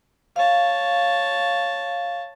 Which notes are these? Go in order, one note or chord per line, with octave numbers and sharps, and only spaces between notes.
C#5 F5 A5